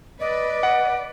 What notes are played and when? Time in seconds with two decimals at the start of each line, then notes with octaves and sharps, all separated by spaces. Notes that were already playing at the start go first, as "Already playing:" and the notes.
0.20 B4 D5 D#5
0.63 F#5